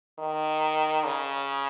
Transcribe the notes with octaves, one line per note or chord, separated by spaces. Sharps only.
D#3
C#3